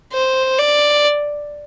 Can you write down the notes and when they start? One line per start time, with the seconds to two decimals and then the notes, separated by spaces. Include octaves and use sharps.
0.13 C5
0.58 D5